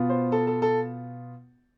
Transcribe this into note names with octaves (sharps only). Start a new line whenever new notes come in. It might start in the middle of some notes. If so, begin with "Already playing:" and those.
Already playing: B2 B3 F4
C5
A4
A4
A4